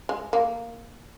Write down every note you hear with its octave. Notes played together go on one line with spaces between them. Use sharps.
G#3
A#3